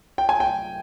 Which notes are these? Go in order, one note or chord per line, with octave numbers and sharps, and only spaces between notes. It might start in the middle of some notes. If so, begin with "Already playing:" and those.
G5
G#5
G5